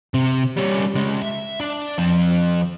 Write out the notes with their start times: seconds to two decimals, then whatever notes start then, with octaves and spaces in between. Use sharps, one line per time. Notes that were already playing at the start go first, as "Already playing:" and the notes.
0.14 C3
0.57 G3 C#4
0.95 C#2 G#3
1.22 E5
1.60 D4
1.98 F3 C4